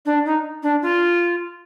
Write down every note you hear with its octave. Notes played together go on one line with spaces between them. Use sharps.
D4
D#4
D4
F4